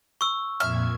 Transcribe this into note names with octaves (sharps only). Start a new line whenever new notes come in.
C#6 E6
F2 A#2 E5 F6 G#6